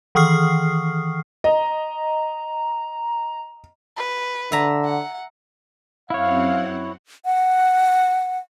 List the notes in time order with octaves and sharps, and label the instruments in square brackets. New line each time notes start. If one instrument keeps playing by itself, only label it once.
[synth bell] D#3 E3 C#6 D#6 F6 C7
[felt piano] D#5 [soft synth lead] A#5
[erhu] B4
[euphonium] D3 [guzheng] E5 A#5
[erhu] F#5
[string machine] F#2 C4 F#5 [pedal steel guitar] E4 C#5 [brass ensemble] F5
[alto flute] F#5